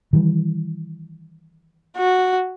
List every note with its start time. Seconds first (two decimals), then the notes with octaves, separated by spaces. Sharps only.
0.13 D#3 E3 G3
1.97 F#4